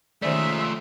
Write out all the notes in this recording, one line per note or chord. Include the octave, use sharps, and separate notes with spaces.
D#3 F3 G#3 A3 C#4 D#4 D5 E5